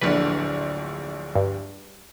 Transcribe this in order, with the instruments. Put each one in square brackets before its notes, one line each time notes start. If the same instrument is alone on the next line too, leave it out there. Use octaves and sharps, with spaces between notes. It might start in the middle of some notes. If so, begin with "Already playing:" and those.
[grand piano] D1 A#1 D3 [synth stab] B4
[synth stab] G2